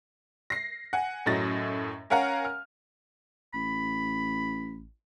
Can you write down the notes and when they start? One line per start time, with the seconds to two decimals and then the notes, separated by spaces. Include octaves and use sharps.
0.50 A#6 C7
0.93 F#5 G#5
1.26 F#2 A2 F#3 D#5 A6 A#6
2.10 C#4 A#4 F5 F#5 G#5 A#5
2.45 F6
3.54 A1 B5